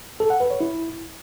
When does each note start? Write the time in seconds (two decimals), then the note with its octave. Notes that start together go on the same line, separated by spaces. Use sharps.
0.20 A4
0.30 F#5
0.40 B4
0.50 C#5
0.60 E4